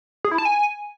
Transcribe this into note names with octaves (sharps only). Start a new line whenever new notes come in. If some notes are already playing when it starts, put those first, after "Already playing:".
G#4
E4
A5
G#5